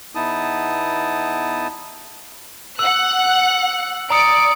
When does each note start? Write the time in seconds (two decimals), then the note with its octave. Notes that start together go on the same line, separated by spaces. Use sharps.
0.15 E2 B3 D#4 E4 A5 D#6
2.79 F#5 E6 F#6
4.10 D5 A#5 D#6 C#7 D7